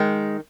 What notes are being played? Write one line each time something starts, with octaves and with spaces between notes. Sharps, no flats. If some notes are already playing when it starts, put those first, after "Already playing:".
Already playing: D#3 G#3